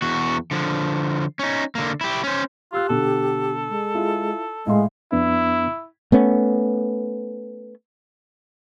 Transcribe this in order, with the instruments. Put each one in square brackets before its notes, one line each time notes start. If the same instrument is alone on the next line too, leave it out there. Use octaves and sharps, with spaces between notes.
[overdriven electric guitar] E2 F#4
D3 F3
C#4 D#4
D3 A#3
E4 G4
C#4 C5
[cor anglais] F4 [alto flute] G4 [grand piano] C6 E6 F#6
[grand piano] B2 D3 [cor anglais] A4
[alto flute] G#3
[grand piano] E4 F4
[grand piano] A2 F5 C6 [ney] G#3 [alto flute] D#5
[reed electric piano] F2 B3 D4 [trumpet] E4
[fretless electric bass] A3 B3 C#4